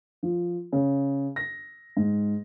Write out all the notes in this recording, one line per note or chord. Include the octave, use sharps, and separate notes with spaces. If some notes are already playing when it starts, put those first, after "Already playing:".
F3
C#3
A#6
G#2